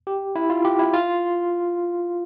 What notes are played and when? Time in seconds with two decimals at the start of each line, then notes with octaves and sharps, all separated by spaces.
0.07 G4
0.36 E4
0.50 F4
0.65 G4
0.79 E4
0.93 F4